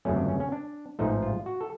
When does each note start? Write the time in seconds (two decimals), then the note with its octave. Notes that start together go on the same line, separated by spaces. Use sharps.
0.05 G1 F2 C#3 F#3 A3 C#4
0.16 D4
0.28 C#4
0.40 C#4
0.52 D4
0.99 A1 G#2 F3 A3 D#4
1.22 F4
1.46 F#4
1.61 A4